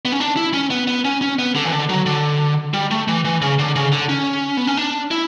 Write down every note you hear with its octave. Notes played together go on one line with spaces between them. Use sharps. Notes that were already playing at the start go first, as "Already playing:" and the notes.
B3
C#4
D4
E4
C#4
B3
B3
C#4
C#4
B3
D3
E3
D3
F#3
D3
G3
A3
E3
E3
C#3
D3
C#3
D3
C#4
B3
C#4
D4
E4